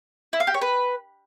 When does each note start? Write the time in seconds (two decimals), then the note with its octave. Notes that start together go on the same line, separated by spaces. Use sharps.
0.33 E4
0.40 F5
0.47 G4
0.54 C#5
0.61 B4